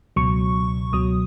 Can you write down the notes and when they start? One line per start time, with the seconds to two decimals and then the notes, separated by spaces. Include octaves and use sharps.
0.16 C#2 B2 F#3 C#6
0.93 C#2 B2 F#3 D#6